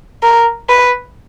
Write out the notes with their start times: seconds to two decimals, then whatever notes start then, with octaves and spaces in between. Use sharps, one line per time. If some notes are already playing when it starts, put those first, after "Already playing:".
0.23 A#4
0.69 B4